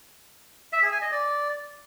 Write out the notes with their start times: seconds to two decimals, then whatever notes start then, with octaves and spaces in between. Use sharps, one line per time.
0.73 E5
0.82 G#4
0.92 G#5
1.02 D#5
1.11 D5